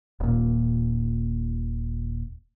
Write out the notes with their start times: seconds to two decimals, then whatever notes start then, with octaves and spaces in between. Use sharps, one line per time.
0.20 D#1 A#2